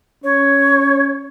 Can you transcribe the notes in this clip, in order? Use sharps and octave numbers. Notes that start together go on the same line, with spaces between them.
C#4 C#5